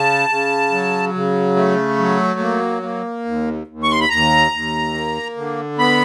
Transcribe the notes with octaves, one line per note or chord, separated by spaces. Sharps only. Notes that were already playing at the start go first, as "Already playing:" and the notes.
Already playing: C#3 A5
C#3
F#3
C#3
A3
F#3
A#3
A#3
D#2
D#2
C#6
C6
B5
D#2 A#5
D#2
A#3
D3
B3 B5